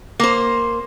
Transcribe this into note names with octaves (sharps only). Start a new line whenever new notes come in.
A#3 C5